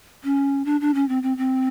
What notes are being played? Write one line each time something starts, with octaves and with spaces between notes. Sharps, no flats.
C#4
D4
D4
C#4
C4
C4
C4